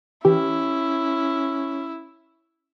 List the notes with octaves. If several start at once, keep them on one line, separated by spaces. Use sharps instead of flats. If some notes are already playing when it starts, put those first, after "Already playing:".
E3 C#4 E4 G4